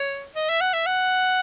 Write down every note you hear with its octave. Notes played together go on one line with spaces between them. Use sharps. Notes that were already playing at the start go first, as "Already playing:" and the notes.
Already playing: C#5
D#5
E5
F#5
E5
F#5